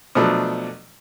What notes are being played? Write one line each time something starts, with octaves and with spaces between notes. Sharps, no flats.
B2 F3 F#3 A3 D4